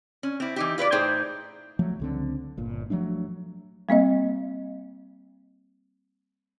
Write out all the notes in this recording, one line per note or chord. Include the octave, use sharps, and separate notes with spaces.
C#4
C4 E4
E3 D#4 G4
F4 B4 C5 D5
A2 D#4 G#4 C5 G5
F3 F#3 A3
C#2 D3 C4
G1 A#2
F3 F#3 A3 D4
G3 A#3 C4 D#5